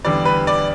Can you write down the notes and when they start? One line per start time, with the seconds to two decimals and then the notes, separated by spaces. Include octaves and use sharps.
0.04 E2 D3 G3 B3 D5
0.25 B4
0.47 D5